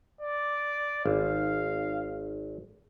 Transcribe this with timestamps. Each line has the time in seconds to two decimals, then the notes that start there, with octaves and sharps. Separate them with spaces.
0.21 D5
1.06 G#1 F5